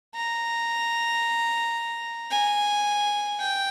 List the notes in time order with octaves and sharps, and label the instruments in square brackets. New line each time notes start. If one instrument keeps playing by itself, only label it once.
[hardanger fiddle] A#5
G#5
G5